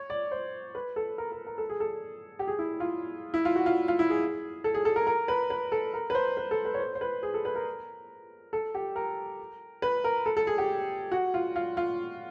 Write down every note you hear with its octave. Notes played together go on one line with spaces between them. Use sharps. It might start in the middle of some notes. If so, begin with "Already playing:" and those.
Already playing: C#5
D5
C5
B4
A4
A#4
A#4
A#4
A4
G#4
A4
G4
G#4
E4
F4
E4
F4
F#4
F4
F4
E4
G#4
A4
G#4
A4
A#4
A#4
B4
B4
A4
A#4
B4
C5
B4
A4
B4
C#5
C5
C5
B4
G#4
A4
B4
A#4
A4
G4
A#4
B4
A#4
A4
A4
G#4
G4
F#4
F4
F4
F4